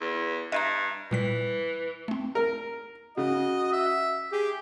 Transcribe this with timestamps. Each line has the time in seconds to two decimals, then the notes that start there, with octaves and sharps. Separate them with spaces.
0.01 E2
0.52 G2 D#5 E5 A#5
1.11 A#2 E3 G3 B6
2.08 A3 C4
2.35 A#4
3.17 C#3 F#4 D#5
3.72 E5
4.32 G4 G#4